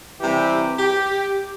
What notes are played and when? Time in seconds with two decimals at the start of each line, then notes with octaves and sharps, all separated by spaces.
0.19 C3 E3 G3 G4
0.77 G4